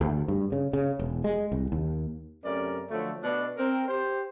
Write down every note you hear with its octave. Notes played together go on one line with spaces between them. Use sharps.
D2
G2
C#3
C#3
E1
G#3
C2
D#2
F#2 C3 A3 C#4 A#4 D5
D3 F3 F#3 A3
B2 D4
C4 A#4
G4 C5